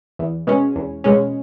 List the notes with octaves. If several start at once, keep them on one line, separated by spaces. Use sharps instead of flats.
E2
B2 G#3 C#4
E2
B2 G#3 C#4